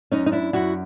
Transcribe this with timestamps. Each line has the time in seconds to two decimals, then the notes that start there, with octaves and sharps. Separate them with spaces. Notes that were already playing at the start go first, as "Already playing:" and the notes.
0.11 F#2 C#4 D#4
0.26 D#4
0.32 D4 E4
0.53 F#2 E4 F#4